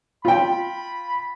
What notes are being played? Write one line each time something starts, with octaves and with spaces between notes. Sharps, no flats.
F4 G5 B5